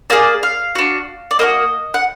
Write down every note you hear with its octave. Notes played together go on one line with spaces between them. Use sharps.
A#3 F4 G#4 D5
F5
D4 F#4
D5
A#3 D4 F#4 D#5
F#5